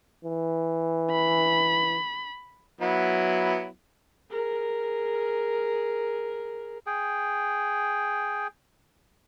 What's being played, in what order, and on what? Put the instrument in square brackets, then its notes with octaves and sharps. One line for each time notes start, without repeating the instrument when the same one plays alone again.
[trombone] E3
[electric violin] B5
[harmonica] F#3 B3 E4
[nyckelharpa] G#4 A#4
[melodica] G#4 G5